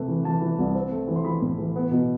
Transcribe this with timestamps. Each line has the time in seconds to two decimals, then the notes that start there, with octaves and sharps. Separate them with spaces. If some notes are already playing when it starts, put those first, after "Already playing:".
Already playing: C3 A3 B4
0.08 E3
0.25 E3 A5
0.41 E3
0.59 C2
0.75 C4
0.91 A3
1.08 E3
1.16 C6
1.25 E3 B5
1.42 A2
1.59 E3
1.76 B3
1.91 B2